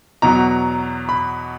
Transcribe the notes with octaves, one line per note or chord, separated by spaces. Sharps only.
E2 B2 F#3 A#5
B5